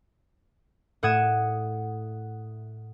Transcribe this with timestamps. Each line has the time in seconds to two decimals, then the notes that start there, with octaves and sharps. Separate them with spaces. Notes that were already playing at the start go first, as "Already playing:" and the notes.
1.03 A2 F#5 D#6 G#6 E7